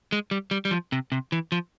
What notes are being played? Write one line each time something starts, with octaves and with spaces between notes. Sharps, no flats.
G#3
G3
G3
G3
F3
C3
C3
E3
F3